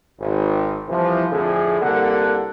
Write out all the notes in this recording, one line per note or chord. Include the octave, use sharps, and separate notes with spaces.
G#1
C2 C3 E3 F3
F2 A2 D3 G#4
C2 D3 A#3 A4 F#5